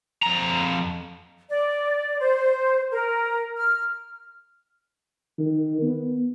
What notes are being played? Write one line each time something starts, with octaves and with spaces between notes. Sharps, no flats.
F2 A#5
D5
C5
A#4
F6
D#3
B3